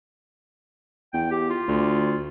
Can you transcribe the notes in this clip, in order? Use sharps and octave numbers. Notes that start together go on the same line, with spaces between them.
E2 G5
G4
F4
D2